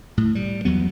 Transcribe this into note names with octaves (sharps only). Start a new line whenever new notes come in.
A2
G3
E2 F#3 B3